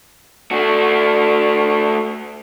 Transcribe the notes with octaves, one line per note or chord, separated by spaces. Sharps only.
A3 F#4